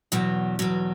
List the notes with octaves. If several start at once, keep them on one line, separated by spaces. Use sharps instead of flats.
E2 B2 F#3
E2 B2 F#3